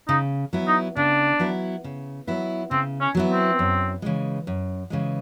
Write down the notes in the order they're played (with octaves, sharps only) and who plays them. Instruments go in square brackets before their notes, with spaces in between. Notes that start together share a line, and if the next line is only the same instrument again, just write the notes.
[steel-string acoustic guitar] C#3 [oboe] D#4
[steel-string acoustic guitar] F#3 B3 E4
[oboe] D#4
[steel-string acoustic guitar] C#3 [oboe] D4
[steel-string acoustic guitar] F#3 B3 E4
C#3
F#3 B3 E4
[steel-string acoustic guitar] C#3 [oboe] C4
[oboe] C#4
[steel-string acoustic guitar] F#3 B3 E4
[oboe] C4
[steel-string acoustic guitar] F#2
C#3 E3 G#3
F#2
C#3 E3 G#3